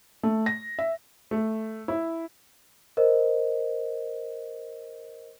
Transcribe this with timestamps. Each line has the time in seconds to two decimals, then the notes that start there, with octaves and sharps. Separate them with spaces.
0.23 A3
0.46 A#6
0.79 E5
1.31 A3
1.88 E4
2.97 A#4 C5 D#5